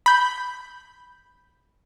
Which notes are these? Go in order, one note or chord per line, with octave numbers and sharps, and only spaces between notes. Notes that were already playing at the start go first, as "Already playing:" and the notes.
B5 G6